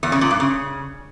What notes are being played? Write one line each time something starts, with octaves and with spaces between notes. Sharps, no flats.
E2
C#3
A#2
G2
C#3